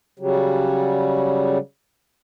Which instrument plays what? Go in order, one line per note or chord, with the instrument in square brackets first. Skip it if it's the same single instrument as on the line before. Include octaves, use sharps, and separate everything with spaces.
[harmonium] C#3 F#3 G3